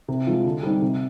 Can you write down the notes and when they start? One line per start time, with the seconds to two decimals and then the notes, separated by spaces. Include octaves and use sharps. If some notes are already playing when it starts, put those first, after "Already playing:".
0.08 C3
0.27 F3 G#3
0.45 D3
0.63 G3 C4 D#4
0.82 C3